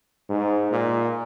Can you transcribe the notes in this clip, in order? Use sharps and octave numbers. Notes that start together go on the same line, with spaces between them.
G#2
A#2